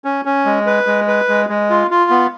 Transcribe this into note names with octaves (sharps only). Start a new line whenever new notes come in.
C#4
C#4
G#3
B4
G#3
B4
G#3
G#3
F4
F4
B3